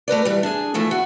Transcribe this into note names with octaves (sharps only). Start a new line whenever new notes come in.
A3 A#4 B4 D5
E3 G3
D4 G#4
E3 F3 A3 E4
F#4